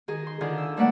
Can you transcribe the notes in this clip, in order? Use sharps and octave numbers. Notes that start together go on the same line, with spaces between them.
D#3 D#4 G#4
C6
D3 D#3 F4 G#4
E6
G3 A3 A#3 B4 D5 F#5